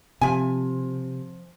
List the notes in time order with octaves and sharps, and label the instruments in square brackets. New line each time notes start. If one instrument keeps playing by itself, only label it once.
[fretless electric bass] C3 [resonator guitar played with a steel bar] F3 G#5